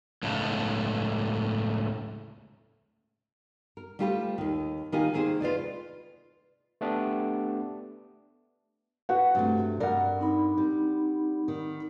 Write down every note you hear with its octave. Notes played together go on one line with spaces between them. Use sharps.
C#2 A2
A#4
G3 A3 F4 G4 A4 B4
D#2 D#3
D#3 A#3 D#4 F4 G4 G#5
C3 D#3 A#3 G#4 C5
F4 B4 D5 D#5
A3 B3 D4 G4
F#4 B4 F#5
G2 C3 A3
G2 A#4 D5 F#5
C4 D#4 B5
G3
D#3